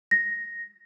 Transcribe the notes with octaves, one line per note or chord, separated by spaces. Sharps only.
A#6